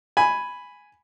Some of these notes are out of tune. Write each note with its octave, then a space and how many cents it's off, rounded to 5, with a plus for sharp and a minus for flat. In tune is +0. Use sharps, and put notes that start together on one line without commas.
G#5 +0 B5 +0